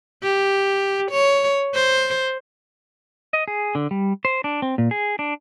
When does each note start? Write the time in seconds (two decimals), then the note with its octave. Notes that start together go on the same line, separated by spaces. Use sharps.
0.23 G4
1.11 C#5
1.74 C5
3.33 D#5
3.48 G#4
3.75 D3
3.91 G3
4.25 C5
4.44 D4
4.62 C4
4.78 A#2
4.91 G#4
5.19 D4